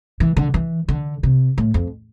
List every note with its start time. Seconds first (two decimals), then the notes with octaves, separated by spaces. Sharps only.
0.20 E3
0.37 D3
0.54 E3
0.88 D3
1.23 C3
1.58 A2
1.74 F2